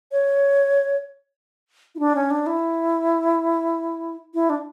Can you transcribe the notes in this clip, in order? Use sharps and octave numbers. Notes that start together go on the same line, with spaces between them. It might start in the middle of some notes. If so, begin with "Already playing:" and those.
C#5
E4
D4
C#4
D4
E4
E4
D4